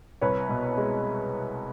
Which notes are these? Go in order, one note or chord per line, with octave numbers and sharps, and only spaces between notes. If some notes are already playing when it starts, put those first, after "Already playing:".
C2 B4 C#5
B2
G#3